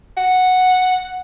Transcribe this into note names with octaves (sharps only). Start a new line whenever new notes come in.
F#5